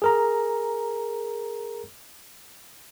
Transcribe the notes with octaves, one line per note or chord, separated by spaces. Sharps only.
G#4 A#4 A#5